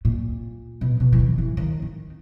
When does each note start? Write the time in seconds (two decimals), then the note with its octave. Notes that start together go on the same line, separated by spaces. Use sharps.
0.05 A#2
0.81 B2
1.00 B2
1.13 E3
1.19 D#3
1.38 E3
1.57 D#3
1.82 D#3